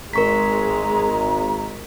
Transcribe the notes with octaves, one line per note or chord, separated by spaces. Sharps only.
G#1 G#3 A#4 A#5 C#6 B6